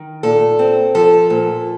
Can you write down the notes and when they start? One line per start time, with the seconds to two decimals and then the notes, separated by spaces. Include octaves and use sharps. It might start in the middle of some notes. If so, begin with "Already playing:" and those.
Already playing: D#3
0.23 A#2 A4
0.59 C4
0.95 F3 A4
1.30 A#2